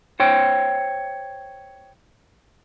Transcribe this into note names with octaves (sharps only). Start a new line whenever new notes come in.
C5 C#5 G5